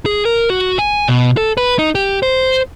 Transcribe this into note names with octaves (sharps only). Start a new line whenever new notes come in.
G#4
A#4
F#4
G#5
B2
A4
B4
D#4
G4
C5